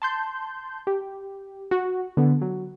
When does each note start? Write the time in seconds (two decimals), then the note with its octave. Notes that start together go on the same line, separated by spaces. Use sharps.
0.02 A5 C6 G6
0.87 G4
1.71 F#4
2.17 D3 B3
2.41 F#3